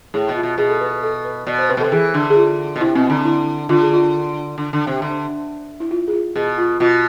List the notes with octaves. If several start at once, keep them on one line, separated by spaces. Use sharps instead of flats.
A2 G#4
B2
F4
B2
B2 G#4
A4
B4
A4
B4
B2 D5
C5
C3 B4
B2
C3 A4
E3 G#4
D3
G#4
F4
B2
C3 E4
B2 C4
D3 D4
E4
D3 F4
G#4
F4
D3
D3
C3
D3 D4
E4
F4
G#4
F4
B2 G#4
F4
B2 F4